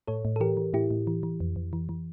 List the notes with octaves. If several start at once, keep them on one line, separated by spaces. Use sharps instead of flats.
A2 A4 C#5
A2
A4
E3 G4 A#4
E3
A2 E4 G4
A2
E3
E3
F2
F2
E3
E3